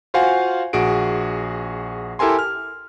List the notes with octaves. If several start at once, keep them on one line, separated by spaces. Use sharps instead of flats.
F4 F#4 C5 F5 F#5 G#5
A#1 F#4 G#4 D7
E4 G4 A4 A#4 G#5 C6
F6